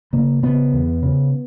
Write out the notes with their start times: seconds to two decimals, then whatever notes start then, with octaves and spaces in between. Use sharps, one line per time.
0.13 C#3 A#3
0.43 C#3 B3
0.73 E2
1.03 C#3